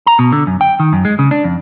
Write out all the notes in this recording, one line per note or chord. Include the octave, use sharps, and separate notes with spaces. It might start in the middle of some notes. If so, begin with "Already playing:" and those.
A#5
B2
D3
F#2
G5
D#3
F#2
G#3
C#3
D4
F2